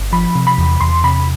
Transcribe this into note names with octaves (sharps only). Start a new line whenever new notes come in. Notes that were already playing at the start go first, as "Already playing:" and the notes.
Already playing: G1
F3 B5
C3
B5
E2
E2 C6
C3 B5